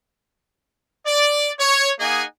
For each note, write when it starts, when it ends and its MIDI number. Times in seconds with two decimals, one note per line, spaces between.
1.06 1.51 74
1.60 1.91 73
2.00 2.24 58
2.00 2.24 63
2.00 2.24 68
2.00 2.24 75
2.00 2.24 78
2.00 2.24 80